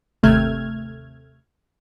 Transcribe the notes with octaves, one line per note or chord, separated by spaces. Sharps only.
G1 D#2 C3 A3 F6 G#6